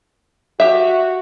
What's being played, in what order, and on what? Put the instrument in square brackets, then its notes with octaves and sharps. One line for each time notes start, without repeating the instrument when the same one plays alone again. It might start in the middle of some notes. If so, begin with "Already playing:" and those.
[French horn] F#4 [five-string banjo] G4 E5